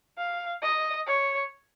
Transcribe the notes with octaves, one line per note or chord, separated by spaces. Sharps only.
F5
D#5
C#5